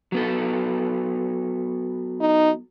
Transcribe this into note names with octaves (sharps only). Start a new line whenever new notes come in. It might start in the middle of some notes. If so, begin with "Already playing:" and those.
F#3 B3 A4
D#4